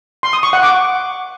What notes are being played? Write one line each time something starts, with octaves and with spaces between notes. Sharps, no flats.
C6
D#6
C#6
F#5
D6